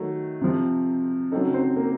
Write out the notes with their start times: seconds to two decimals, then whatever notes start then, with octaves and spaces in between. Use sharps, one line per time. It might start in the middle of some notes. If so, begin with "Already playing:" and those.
Already playing: D#3 F#3 A3
0.41 C3 F3 C4
1.31 C#3 F#3 C4 D#4 A4
1.54 C4 C5
1.76 A#3 A#4